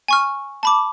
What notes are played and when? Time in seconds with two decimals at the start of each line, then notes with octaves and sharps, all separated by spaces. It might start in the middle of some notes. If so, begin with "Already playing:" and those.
0.08 G#5 C#6 F6
0.63 A5 B5 D6